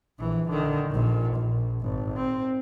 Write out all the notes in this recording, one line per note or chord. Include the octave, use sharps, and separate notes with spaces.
A#1 E3
D3 D#3
A#1 A#2
A#1
G#1
C4